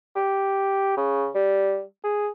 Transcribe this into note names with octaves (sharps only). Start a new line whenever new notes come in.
G4
C#3
G3
G#4